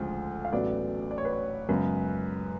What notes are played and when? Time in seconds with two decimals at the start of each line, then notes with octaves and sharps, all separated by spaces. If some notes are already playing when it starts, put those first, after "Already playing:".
Already playing: D2 C#3 F3 G#3
0.45 F5
0.52 A1 A2 F#3 B3 D5
1.11 D5
1.18 C#5
1.25 B4
1.32 C#5
1.69 F#2 C#3 G#3 B3 B4